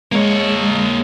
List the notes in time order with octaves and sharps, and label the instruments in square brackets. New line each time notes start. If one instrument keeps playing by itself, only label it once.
[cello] G#3 [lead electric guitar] A#3 C#5